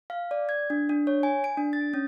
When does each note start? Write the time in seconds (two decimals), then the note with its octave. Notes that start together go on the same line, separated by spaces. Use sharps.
0.10 F5
0.31 D5
0.49 G#6
0.70 D4
0.89 D4
1.07 C#5
1.23 G#5
1.44 D7
1.57 D4
1.73 A6
1.94 C#4